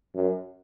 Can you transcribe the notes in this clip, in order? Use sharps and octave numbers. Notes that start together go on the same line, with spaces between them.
F#2